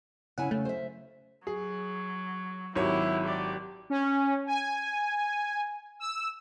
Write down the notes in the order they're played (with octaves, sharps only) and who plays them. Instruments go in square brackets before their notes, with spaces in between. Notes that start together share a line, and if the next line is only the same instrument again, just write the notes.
[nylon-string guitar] C#3 E4 G#5 [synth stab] F#5
[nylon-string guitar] C#3 [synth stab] A3
[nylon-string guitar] C5 E5
[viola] F#3 [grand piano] G#4
[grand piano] G#1 F#3 C#5 [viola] E4 G4
[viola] G4 D5
[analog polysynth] C#4
G#5
E6